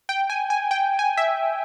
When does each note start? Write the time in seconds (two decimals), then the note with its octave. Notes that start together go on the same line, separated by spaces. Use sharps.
0.09 G5
0.30 G#5
0.50 G#5
0.71 G5
0.99 G#5
1.17 E5